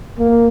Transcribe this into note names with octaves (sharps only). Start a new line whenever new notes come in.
A#3